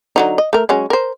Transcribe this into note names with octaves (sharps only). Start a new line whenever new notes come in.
D3 F#3 D#4
D#5
A3 A#4
F#3 G#3 C#4
A#4 C5